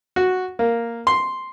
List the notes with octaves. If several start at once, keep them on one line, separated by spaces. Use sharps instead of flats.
F#4
A#3
C6